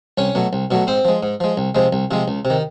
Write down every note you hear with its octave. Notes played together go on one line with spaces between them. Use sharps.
C2 C#4 C#5
B2 F#3 A3
C2
B2 F#3 A3
G#2 C4 C5
F3 G#3
G#2
F3 G#3
C2
C3 F3 G#3
C2
C3 F3 G#3
C#2
C3
D#3